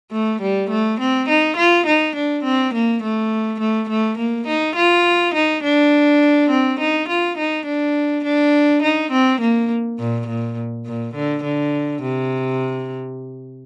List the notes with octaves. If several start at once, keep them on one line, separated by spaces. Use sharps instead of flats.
A3
G3
A3
C4
D#4
F4
D#4
D4
C4
A#3
A3
A3
A3
A#3
D#4
F4
D#4
D4
C4
D#4
F4
D#4
D4
D4
D#4
C4
A#3
A#2
A#2
A#2
D3
D3
C3